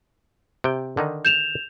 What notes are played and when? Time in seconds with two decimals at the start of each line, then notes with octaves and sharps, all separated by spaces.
0.64 C3 G5
0.97 D3 D#3 D#4
1.25 G6 E7 F7